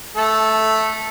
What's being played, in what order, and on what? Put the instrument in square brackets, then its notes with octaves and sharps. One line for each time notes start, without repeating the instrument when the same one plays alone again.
[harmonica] A3 A4